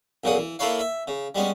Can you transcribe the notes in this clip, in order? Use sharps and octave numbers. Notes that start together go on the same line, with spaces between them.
B1 A#2 C#3 F#3 F#5 D#6
E3
A#3 E4 A4 B4 C#5 F5
E5
C#3
G3 G#3 B3 C#4